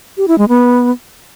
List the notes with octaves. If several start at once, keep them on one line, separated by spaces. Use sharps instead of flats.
G4
E4
G#3
B3